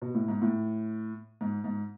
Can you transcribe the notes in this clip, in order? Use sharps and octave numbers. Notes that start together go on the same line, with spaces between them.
B2
A2
G#2
A2
G#2
G#2